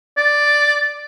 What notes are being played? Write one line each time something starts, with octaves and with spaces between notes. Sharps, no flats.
D5